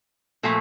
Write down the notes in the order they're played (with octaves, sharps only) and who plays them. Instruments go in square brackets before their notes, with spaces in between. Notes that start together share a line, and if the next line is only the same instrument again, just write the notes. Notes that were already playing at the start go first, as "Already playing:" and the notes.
[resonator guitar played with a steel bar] A#2 F3 A3 A4